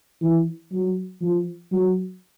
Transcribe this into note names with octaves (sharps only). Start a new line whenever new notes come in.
E3
F#3
F3
F#3